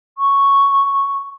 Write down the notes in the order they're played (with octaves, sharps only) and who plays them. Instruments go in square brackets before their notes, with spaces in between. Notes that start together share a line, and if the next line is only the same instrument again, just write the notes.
[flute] C#6